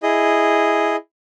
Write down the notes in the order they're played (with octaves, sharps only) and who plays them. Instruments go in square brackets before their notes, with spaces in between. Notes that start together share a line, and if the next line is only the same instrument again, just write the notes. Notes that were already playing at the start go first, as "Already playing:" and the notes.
[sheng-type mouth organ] E4 G#4 D#5